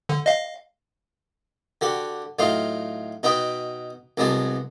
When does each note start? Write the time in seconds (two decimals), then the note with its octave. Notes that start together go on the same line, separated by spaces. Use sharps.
0.09 D3
0.26 D#5 F5
1.81 D3 F#4 G4 F#5
2.39 A2 F#3 D#4 F4 F5
3.23 B2 D#4 F#4 B4 G5 D#6
4.17 C2 F#3 G#3 B3 F#4 A5